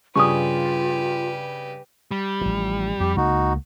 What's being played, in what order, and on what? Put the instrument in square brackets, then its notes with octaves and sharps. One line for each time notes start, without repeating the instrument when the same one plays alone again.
[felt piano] G2 C#3 G#5 [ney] F4 [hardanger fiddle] G4 B4 [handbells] C#6 D#6
[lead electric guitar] G3
[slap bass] A1 F3
[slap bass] F2 [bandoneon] G4
[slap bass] C#2 A#3 [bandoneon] D#4 F#4